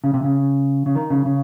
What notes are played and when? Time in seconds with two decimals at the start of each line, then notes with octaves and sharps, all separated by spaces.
0.04 C#3
0.14 C3
0.24 C#3
0.86 C#3
0.95 D#3
1.10 C#3
1.26 C#3